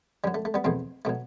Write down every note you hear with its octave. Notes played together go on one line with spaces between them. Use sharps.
F#2 F#3 G3
A3
A3
G3 B3
E2 B2 F#3 A3 C4
B2 F#3 A3